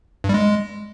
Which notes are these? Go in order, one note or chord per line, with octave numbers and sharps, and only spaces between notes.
G2
G3
G#3